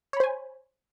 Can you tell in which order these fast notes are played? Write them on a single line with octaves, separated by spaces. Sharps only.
C#5 B5 C5 G#5